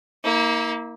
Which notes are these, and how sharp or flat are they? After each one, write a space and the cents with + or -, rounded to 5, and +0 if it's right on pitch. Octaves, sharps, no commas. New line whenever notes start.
A#3 +0 E4 -45